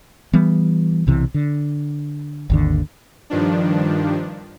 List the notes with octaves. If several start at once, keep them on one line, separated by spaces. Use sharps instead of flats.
E3 G3 B3
B1 C3 E3
D3
G#1 D#2 D3
G2 D#3 F3 D4